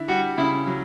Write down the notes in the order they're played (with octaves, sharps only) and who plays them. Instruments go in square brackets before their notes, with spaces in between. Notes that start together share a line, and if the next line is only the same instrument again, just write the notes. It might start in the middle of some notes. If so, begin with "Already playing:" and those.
Already playing: [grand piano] D3 E4
[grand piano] G3 [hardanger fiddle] F#4
[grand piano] C#3 [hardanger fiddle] E4
[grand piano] F#3